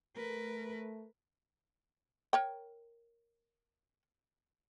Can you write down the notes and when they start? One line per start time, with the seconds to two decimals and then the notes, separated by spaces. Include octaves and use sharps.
0.16 A3 A#4 B4
2.33 A#4 C#5 G5